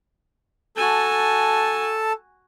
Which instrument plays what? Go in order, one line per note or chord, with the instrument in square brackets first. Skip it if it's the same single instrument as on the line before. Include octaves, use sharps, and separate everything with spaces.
[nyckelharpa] F#4 G#5 [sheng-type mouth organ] A4 A5